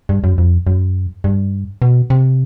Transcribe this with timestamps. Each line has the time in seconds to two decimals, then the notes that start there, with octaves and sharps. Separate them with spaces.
0.09 G2
0.24 F#2
0.38 F2
0.67 F#2
1.24 G2
1.82 B2
2.10 C3